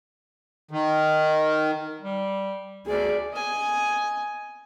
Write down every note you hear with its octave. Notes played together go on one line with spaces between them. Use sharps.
D#3
G3
D2 G#4 D5
D#5 G#5